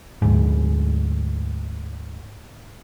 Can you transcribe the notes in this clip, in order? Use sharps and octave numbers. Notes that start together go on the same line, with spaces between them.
D2 G#2